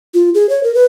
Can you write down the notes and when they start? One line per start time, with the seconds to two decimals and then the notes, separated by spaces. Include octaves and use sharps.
0.14 F4
0.34 G#4
0.49 C#5
0.63 A#4
0.75 B4